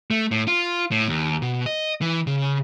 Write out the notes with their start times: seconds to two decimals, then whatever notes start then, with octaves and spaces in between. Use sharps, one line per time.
0.11 A3
0.31 A2
0.48 F4
0.91 A2
1.08 D#2
1.42 B2
1.66 D#5
2.01 E3
2.27 C#3